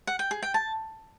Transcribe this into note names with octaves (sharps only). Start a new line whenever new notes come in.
F#5
G5
G#4
G5
A5